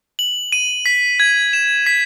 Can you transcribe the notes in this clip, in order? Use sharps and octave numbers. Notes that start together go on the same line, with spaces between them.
F#7
D#7
B6
G#6
E7
B6